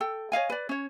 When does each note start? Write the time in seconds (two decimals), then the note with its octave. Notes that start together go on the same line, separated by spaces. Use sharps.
0.01 A4 G5
0.32 C#5 D#5 F5 G#5
0.50 B4 D5
0.69 C#4 C#5